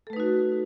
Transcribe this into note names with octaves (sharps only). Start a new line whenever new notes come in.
A3 D#4 F#4 A4 B4